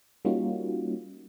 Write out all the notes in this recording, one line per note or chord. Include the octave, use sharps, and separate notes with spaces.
G3 A#3 C#4 D#4 F4 F#4